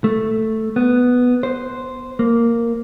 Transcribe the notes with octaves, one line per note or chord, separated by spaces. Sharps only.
A3
B3
C5
A#3